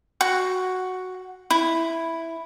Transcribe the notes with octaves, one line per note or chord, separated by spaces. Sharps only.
F#4
E4